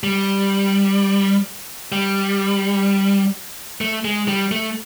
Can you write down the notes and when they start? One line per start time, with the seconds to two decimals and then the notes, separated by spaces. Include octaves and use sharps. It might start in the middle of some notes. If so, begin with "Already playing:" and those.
0.03 G3
1.92 G3
3.81 A3
4.05 G#3
4.28 G3
4.52 A3